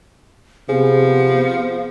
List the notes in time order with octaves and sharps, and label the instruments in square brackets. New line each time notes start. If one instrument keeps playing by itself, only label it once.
[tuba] C3 [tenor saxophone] F3 [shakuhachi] B3 [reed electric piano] G#4